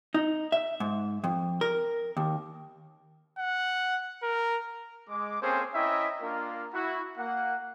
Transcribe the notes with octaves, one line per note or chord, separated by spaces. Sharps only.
D#4
E5
G#2
F2
A#4
D#2
F#5
A#4
G#3 D6
A#3 C4 C#4 G#4 A4 C5
C#4 E4 D#5 E5 G5 A#5
A#3 D4 F4 A#4
E4 F#4
A#3 F#5